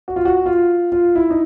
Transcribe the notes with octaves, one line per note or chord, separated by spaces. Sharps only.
F#4
F4
F#4
F4
F4
E4
D#4